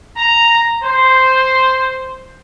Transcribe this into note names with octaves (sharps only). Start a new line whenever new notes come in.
A#5
C5